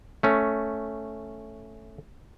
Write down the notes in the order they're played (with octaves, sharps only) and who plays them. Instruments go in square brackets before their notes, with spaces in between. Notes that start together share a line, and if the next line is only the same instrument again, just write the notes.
[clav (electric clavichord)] A3 C#4